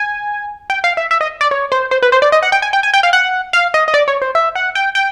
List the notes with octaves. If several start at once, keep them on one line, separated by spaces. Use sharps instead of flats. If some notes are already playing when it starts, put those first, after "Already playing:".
Already playing: G#5
G5
F5
E5
E5
D#5
D5
C#5
C5
C5
B4
C5
D5
D#5
F#5
G5
G#5
G5
G#5
G5
F5
F#5
F5
D#5
D#5
D5
C#5
C5
E5
F#5
G5
G5